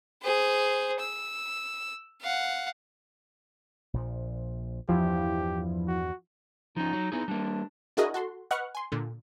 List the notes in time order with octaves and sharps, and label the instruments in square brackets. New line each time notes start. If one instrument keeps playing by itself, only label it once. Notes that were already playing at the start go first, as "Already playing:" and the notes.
[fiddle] G#4 C5
E6
F5 F#5
[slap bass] A#1 A#2 F3
[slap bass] E2 G2 [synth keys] F3 E4 [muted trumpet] G4
[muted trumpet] F#4
[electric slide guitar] F3 C#4 [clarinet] D#4
[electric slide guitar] F#3
[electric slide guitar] B3 E4 G#4 [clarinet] D#4
[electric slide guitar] G3 A#3 [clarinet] D4
[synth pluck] D4 E4 F#4 G#4 A#4 D#5
F#4 A4 C6
B4 D#5 F#5 C#6 F6 F#6
G#5 C6
A#2 D3